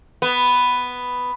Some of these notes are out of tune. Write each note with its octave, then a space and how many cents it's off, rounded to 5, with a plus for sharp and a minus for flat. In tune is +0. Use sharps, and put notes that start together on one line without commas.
B3 +5